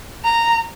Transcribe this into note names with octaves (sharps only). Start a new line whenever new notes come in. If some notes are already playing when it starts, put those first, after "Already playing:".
A#5